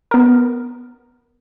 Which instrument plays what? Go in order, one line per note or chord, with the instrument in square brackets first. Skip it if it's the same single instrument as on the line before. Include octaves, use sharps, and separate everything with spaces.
[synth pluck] B3 A#4